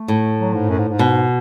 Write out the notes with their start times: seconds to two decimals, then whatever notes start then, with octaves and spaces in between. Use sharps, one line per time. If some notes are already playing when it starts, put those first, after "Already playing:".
Already playing: A3
0.08 A2
0.38 F#3
0.54 G#2
0.69 F#2
0.78 G#2
0.89 G#2
0.99 B2